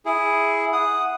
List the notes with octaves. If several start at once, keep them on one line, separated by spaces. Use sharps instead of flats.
E4 G#4
F#5 D#6